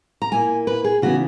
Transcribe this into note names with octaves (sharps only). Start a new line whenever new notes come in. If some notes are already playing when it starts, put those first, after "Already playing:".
A#5
A#2 A#3 E4 G#5
B4
G#4
C#3 E3 B3 D#4 F#4